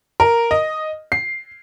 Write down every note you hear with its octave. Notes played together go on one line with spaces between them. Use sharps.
A#4
D#5
C7